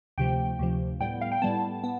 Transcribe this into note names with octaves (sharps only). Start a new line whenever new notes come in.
D2 C3 F3 G5
D2 C3 F3
A2 G3 B3 G5
F5
G5
A2 G3 B3 A5
B3